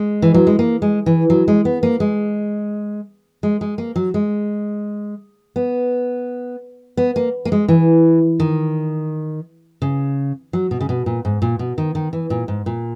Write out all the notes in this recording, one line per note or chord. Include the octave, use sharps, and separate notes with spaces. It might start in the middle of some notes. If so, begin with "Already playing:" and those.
Already playing: G#3
E3
F#3
G#3
A#3
G#3
E3
F#3
G#3
B3
A#3
G#3
G#3
G#3
A#3
F#3
G#3
B3
B3
A#3
A#3
G#3
E3
D#3
C#3
F#3
B2
C#3
B2
A#2
G#2
A#2
B2
D#3
D#3
E3
A#2
G#2
A#2